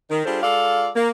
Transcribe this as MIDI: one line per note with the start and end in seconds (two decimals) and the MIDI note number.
0.10 0.25 51
0.25 0.39 55
0.25 0.39 62
0.25 0.39 65
0.25 0.39 68
0.25 0.39 69
0.25 0.39 72
0.43 0.89 56
0.43 0.89 65
0.43 0.89 69
0.43 0.89 74
0.43 0.89 77
0.96 1.10 58